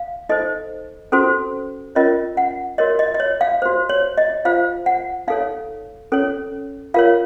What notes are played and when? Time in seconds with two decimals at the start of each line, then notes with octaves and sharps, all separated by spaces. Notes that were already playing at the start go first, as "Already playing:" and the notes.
Already playing: F5
0.29 D#4 A4 C5 D#5
1.12 C#4 F#4 A4 C5
1.95 C#4 F4 A#4 C#5 D#5
2.37 F#5
2.78 F#4 A#4 C#5 D#5
2.99 D#5
3.15 D#5
3.20 C#5
3.41 F5
3.62 F#4 C5
3.89 C#5
4.18 D#5
4.45 F4 C5 F5
4.86 F#5
5.28 D#4 A4 C#5 F5
6.12 C#4 A4 C#5
6.94 F4 A#4 C#5 F5